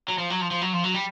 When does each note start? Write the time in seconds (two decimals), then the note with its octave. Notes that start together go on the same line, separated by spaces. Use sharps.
0.08 F#3
0.18 F3
0.30 F#3
0.41 F3
0.51 F3
0.62 F#3
0.73 F3
0.84 F#3
0.94 G3